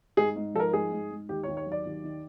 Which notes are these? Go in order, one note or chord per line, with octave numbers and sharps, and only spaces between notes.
G#2 G#4
G#2
F3 A4 A#4
G#2 G#4
G#2
G#2
D#2 G4
D#2 C#5
C#5
F#3
D5
D#2
D#3